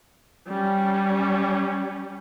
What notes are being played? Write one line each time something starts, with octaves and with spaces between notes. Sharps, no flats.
G3 C#4